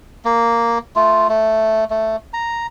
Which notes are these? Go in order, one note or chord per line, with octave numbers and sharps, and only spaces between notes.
A#3
A3 F4
A3
A3
A#5